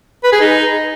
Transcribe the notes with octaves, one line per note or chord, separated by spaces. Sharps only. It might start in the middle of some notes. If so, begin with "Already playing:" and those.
B4
G#4
D#4